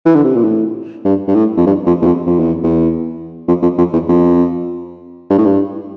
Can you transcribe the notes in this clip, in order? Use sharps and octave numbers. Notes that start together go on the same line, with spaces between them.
E3
D3
C3
A#2
A2
G2
G2
A2
F2
G2
F2
E2
F2
F2
E2
E2
F2
F2
F2
E2
F2
G2
A2
G2